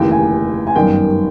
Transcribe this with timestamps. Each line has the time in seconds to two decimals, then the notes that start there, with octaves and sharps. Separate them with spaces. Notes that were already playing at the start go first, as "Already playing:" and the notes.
Already playing: F1 D#2 C#3 E3 G5
0.11 G#5
0.67 G#5
0.75 G1 F#2 D#3 G5